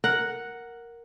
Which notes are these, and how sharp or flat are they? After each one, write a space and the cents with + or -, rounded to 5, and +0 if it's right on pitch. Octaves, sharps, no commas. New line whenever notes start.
A#4 +0 F#5 +0